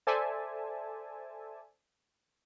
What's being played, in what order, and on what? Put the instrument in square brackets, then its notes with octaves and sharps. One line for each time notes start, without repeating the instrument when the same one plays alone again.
[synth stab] A4 C5 D5 E5 G#5 A5